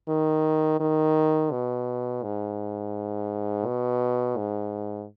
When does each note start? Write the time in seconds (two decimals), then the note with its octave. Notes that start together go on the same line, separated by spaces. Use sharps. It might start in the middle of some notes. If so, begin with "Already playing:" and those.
0.09 D#3
0.80 D#3
1.52 B2
2.23 G#2
3.66 B2
4.37 G#2